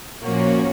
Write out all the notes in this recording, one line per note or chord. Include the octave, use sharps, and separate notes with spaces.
A#2 F3 A#3 C#4 F#4